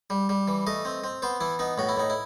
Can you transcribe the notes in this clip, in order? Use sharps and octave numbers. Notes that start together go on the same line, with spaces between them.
G3
G3
E3
A3 D#5
C4
C4
B3 C5
E3 E4
B3 D#4
A2 F#4
E4
A2 D#4
E4